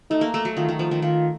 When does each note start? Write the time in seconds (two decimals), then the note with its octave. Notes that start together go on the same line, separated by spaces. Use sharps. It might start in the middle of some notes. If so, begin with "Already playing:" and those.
0.10 A3 D#4
0.21 A#3
0.34 A3
0.45 F#3
0.57 D#3 F4
0.69 D#3
0.79 F3
0.91 D#3
1.02 D#3 F4